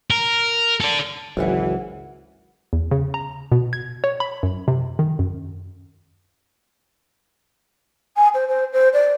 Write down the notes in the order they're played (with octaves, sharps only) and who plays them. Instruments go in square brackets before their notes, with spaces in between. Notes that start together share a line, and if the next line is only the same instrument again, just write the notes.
[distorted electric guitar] A#4
A4 D5
[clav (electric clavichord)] G#1 [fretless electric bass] C#2 F#3 [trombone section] E3 [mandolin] F#5 G#5 F6
[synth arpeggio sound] E2
C#3
A#5
B2
G#6
C#5
B5
F#2
C3
D#3
F#2
[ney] G#5
C5
C5
C5
D5